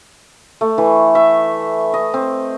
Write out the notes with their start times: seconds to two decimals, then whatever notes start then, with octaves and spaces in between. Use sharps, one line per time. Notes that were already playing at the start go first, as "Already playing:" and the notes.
0.61 A3
0.78 E3
1.15 E5
1.94 D#5
2.14 C4